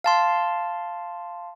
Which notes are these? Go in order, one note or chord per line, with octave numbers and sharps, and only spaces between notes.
F5 A5 C6